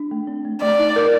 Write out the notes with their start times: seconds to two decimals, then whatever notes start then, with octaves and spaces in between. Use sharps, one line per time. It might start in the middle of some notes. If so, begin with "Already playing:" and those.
Already playing: D4
0.11 A3
0.27 C4
0.45 A3
0.62 A3 D5
0.79 D#4
0.96 A#4